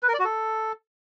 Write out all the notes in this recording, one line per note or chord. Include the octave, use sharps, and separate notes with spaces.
B4
A#4
D5
F#4
A4